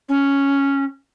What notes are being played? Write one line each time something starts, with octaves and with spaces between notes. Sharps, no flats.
C#4